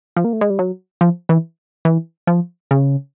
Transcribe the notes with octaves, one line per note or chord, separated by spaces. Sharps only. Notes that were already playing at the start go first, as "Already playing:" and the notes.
F3
A#3
A3
G#3
G3
F#3
F3
E3
E3
F3
C#3